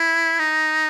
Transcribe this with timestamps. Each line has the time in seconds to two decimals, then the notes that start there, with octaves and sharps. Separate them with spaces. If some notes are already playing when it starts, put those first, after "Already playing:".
Already playing: E4
0.39 D#4